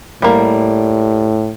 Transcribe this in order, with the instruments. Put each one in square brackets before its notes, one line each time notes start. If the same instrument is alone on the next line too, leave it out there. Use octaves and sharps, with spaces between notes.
[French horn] A2 [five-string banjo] G3 A#3